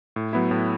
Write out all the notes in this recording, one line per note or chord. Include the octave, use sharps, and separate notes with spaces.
A2
F#3 B3 E4
A2